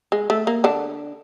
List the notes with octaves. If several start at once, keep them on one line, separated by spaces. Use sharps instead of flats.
G#3
A3
A#3
D3 D4